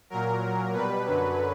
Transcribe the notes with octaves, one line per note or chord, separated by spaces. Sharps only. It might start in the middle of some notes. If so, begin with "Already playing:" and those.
A#2 F#3 A#4
A#2 F#3
B2 G3 B4
F#2 D3 F#3